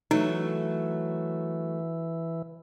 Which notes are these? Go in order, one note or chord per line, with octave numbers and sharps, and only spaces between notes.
E3 F#3 A3 D#4